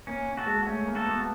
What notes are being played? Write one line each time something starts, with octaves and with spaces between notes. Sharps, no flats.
A#3 C#4
F#4 A4
G#3
A3 C#4
A#3
F#4 A4
B3